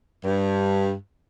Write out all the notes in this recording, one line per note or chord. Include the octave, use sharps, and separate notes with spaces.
G2